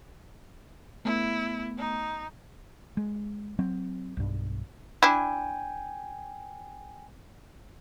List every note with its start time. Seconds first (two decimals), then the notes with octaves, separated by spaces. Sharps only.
1.05 A3 B3 E4
1.78 D#4
2.97 G#3
3.59 F#3 C4
4.17 B1 G2
5.03 D4 E4 G5 G#5